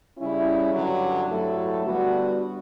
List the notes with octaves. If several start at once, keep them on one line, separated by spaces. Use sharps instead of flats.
C#3 G3 C#4 E4
G2 D3 F#3
G2 F#3 A3 E4 A4
D3 G3 B3 F#4